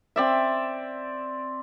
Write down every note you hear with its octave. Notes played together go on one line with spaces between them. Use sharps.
C4 D5 E5